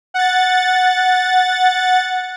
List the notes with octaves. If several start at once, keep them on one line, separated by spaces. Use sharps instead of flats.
F#5 A6